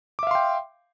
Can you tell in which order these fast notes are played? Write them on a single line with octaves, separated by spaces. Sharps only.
D6 E5 F5 C6 G5